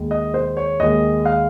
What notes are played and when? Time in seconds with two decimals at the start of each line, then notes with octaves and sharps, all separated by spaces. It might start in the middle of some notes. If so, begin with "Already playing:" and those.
Already playing: D#2 D#3 G#3
0.11 D#5
0.34 C5
0.57 C#5
0.80 D#2 D#3 G#3 D#5
1.26 F5